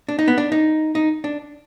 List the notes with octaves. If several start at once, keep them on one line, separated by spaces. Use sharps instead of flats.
D4
D#4
B3
D4
D#4
D#4
D4